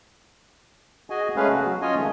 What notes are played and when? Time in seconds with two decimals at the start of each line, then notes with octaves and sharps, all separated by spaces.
1.10 F#4 G#4 D#5 G#5
1.36 G#3 A3 C#4 G#4 B4 F5
1.50 C#3 F#4
1.64 F#3
1.82 C#4 F4 C#5 D#5 G#5
1.98 D#3 F3 G#3 A3